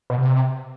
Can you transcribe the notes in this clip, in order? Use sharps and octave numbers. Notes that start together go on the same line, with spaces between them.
B2
C3